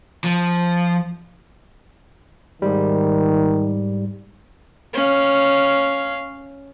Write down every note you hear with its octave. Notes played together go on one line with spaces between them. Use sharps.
F3
G#2 D#3 G3
C#4 F5